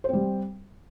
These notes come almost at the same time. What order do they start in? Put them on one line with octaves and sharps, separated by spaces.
C5 C4 G3